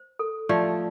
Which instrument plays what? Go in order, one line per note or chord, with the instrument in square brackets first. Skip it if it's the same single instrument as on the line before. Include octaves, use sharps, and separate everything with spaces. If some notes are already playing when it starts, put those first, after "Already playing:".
Already playing: [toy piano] C5
A4
[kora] F3 A3 [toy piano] D5